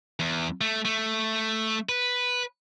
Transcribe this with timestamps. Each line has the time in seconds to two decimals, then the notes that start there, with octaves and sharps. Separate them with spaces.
0.20 E2
0.61 A3
0.85 A3
1.89 B4